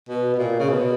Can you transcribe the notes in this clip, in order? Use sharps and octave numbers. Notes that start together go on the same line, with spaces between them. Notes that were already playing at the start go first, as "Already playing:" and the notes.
B2
B2
A#2
C#3
B2